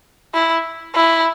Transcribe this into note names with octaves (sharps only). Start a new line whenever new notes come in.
E4
E4